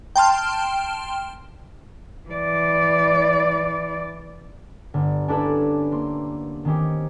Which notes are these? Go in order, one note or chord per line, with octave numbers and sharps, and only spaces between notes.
G5 A5 C6 F6
E3 D5
G1
C#4 D4 E4 A4 B4 D5
A#3 C6
D#3 C4 C#4 G4